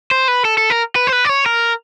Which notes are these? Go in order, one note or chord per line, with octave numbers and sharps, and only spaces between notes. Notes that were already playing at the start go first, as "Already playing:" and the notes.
C5
B4
A4
A4
A#4
B4
C5
B4
D5
C#5
A#4